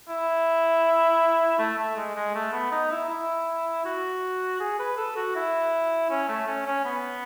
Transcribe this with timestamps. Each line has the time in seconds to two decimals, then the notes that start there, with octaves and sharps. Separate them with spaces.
0.08 E4
1.59 A3
1.79 A3
1.97 G#3
2.15 G#3
2.35 A3
2.53 B3
2.72 D#4
2.91 E4
3.09 E4
3.85 F#4
4.60 G#4
4.79 B4
4.97 A4
5.16 F#4
5.36 E4
6.10 C#4
6.29 A3
6.47 C#4
6.66 C#4
6.85 B3